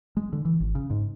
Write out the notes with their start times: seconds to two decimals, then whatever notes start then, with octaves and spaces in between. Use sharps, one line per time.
0.17 G#3
0.33 D3
0.45 E3
0.60 G#1
0.75 C#3
0.90 G#2